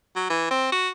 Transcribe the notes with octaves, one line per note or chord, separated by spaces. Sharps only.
F#3
E3
C4
F#4